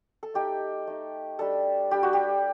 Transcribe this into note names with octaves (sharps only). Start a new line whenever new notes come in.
A4
A3 D#4 G4
A3 D#4
G3 D4 A4
G3 D4 G4
F#4
G4